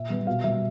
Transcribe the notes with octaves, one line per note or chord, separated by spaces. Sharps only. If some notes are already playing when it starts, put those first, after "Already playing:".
Already playing: A#2 E5
G3 B3
B2 F5
G3 A#3 E5